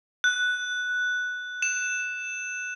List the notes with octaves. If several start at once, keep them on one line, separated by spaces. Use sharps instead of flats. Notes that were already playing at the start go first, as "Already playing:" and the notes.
F#6
E7